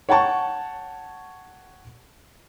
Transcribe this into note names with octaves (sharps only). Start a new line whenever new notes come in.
C#5 F#5 G5 A5 C#6